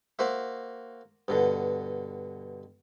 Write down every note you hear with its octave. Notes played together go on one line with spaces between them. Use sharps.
A#3 F#4 C5 E5
G2 B2 D3